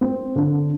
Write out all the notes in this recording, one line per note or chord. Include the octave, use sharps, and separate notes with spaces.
C4
D3